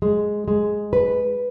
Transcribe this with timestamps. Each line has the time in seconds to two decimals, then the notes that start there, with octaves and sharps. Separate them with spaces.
0.02 G#3
0.48 G#3
0.93 B4